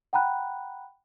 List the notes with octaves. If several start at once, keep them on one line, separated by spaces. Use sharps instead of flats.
F#5 G5 A#5 B5 F#6